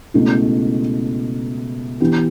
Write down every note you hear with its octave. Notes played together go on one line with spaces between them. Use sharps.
C#2 B2 A3 E4
E3 B3 E4 G4